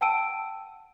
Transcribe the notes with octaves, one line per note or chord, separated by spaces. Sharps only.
F#5 G5 A5 E6 D7 D#7